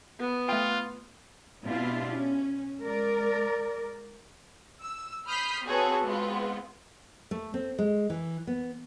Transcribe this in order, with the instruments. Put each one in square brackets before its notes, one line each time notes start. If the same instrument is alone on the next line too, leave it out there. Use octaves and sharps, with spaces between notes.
[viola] B3
[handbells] A3 G5 [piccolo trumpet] F4
[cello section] B2 C4 D4 E4 F4 G4
C#4
G#3 A#4 D5
[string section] E6
B5 D#6 F6 G6 B6 C7
C4 F#4 G#4 A4 B4 C#5
G#3 B3 C4 F4
[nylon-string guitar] A3
C4
G#3
E3
B3